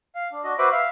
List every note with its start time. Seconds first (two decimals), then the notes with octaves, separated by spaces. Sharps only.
0.15 F5
0.32 D4
0.44 D4 F#4 D#5
0.58 F#4 B4 C5 E5 B5 D6
0.72 E5 F5